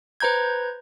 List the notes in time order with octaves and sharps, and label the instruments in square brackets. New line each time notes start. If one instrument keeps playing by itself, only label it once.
[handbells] B4 C5 A#5 G6 G#6